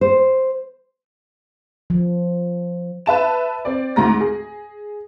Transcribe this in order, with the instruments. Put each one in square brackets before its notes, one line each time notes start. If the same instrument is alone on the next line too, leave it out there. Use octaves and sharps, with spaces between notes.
[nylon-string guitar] C5
[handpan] F3
[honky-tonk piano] B4 E5 A5 E7
C4 D5
D2 G#2 A#5 A#6
G#4